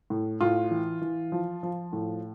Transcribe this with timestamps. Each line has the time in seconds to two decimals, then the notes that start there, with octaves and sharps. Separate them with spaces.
0.10 A2
0.41 A2 F4
0.71 E3
1.01 E3
1.32 F3
1.63 F3
1.93 A2